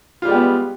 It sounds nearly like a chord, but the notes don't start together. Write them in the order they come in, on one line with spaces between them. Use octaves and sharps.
F4 G3 G#3 G4 B3